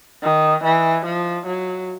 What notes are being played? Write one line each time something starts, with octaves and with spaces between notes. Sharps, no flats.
D#3
E3
F3
F#3